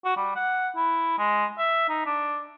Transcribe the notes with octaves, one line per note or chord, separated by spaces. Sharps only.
F#4
G3
F#5
E4
G#3
E5
D#4
D4